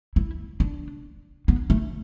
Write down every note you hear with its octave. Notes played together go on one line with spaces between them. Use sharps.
E4
D4
B3
A3